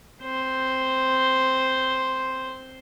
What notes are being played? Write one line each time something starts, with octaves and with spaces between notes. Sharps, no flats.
C4 C5